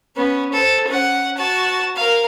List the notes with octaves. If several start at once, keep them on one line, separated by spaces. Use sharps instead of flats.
B3 C#4
A4 C5
C#4 F#5
F#4 A5
A#4 F5